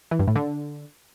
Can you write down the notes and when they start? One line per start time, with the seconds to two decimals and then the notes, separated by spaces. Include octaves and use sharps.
0.11 E3
0.19 G2
0.27 A2
0.36 D3